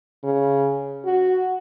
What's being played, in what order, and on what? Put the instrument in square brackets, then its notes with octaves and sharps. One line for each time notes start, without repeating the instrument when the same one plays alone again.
[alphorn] C#3
F#4